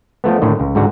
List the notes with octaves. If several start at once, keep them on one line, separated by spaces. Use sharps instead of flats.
F3 A3 B3
A2 D3 D#3
C#2
G#2 D3 F#4